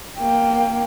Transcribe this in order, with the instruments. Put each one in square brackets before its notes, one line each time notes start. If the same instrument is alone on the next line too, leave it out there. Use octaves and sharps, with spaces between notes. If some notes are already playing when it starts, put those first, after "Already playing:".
[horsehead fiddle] A#3 G5